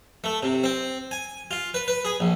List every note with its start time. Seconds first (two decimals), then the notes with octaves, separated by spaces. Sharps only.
0.24 A3
0.43 C3
0.64 C4
1.11 G#5
1.51 F4
1.74 B4
1.88 B4
2.05 G#4
2.20 A#1